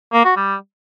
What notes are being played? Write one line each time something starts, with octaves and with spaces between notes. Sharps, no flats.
A#3
F#4
G3